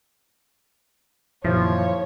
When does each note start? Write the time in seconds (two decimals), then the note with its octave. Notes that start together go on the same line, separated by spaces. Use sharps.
1.44 F#2 A#2 D#3 F3 E4 G4 C5 C#5